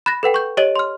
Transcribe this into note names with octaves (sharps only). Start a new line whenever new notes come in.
B5 F#6 A6 A#6
A4 B4 F#5 G5
C#6 G6
G4 C#5 D#5 A6 D#7 F#7
C6 F6